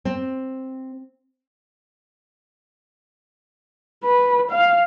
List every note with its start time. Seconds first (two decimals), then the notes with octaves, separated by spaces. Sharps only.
0.05 C4
4.04 B4
4.51 F5